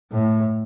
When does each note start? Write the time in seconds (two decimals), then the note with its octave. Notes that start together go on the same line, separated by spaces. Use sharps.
0.12 A2